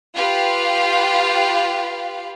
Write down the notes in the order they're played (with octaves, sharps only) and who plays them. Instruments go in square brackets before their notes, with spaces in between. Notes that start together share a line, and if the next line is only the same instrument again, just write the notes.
[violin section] F4 G4 B4 F5